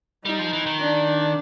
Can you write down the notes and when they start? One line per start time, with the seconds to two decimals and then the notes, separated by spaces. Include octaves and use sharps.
0.25 G3 D#4
0.39 F3
0.53 E3
0.66 D#3
0.80 D4